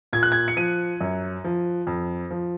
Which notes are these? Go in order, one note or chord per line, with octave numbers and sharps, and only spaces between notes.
A#2 G#6
F#6
G#6
C#7
F3 D#7
F#2
F3
F2
F3